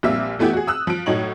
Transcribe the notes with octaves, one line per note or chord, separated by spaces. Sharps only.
A#1 G3 A#3 C4 E5
E3 A3 B3 E4 G4
F#4 G#4
D#6 E6 F#6
F3 D7
A2 F#3 D#4 C#5 F#7